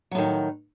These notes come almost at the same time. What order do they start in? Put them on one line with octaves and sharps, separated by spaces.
F#3 A2 D#3